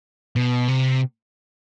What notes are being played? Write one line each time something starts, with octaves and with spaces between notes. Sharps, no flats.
B2
C3